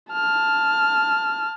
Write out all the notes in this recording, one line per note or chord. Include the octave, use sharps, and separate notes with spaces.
A5 F6